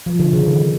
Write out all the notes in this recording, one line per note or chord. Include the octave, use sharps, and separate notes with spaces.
F3
D3
C#3
D#3